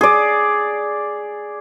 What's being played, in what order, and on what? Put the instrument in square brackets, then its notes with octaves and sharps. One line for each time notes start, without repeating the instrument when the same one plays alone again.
[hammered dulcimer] G#4 D5